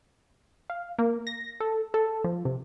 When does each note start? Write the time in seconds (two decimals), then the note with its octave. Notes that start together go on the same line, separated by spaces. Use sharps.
0.70 F5
0.99 A#3
1.27 A#6
1.60 A4
1.94 A4
2.24 F3
2.45 C3